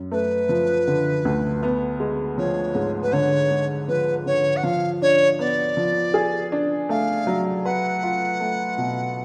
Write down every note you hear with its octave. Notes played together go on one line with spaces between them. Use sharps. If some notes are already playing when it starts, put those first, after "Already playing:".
Already playing: F#2
A3 B4
F3
D3
D2
B3
G#3
F3 C#5
G#2
B4
D3 C#5
G#3
F3 B4
D3 C#5
F#5
F3 F5
D4 C#5
B3 D5
F3
G#4
D4
A3 F5
F#3
B4 F#5
F4
A3
B2